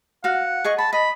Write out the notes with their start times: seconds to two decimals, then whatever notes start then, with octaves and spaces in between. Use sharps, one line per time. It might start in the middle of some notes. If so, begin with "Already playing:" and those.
0.24 F#4 F5 F#5
0.64 G#4 D#5 C#6
0.78 A5 B5
0.93 D#5 B5